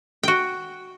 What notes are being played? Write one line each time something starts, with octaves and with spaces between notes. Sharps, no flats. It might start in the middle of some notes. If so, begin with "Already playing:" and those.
F#4 G5